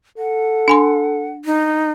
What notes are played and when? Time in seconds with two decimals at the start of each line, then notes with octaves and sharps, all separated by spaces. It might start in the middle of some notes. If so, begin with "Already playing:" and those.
0.18 A4 F#5
0.68 D4 G#5 C6
1.45 D#4